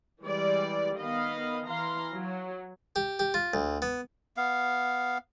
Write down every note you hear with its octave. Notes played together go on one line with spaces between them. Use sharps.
E3 G3 G#3 D5
D#3 B3 D#5 F5 B5
E3 F5 A#5 C6
F#3
G4
G4
F4
D2
B3
B3 F5